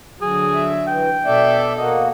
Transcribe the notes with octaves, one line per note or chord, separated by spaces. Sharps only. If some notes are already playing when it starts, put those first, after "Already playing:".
D3 F#3 G#4
E5
E3 G5
B2 A4 D5 E5
A#3 F#4 D#5